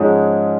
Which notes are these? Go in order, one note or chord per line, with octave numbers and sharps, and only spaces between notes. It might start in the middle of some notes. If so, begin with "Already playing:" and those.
Already playing: G#2 F3 G#3 C#4 G#4